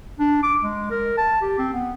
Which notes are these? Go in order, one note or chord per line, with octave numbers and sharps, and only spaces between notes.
D4
D6
G#3
A#4
A5
G4
C4
B3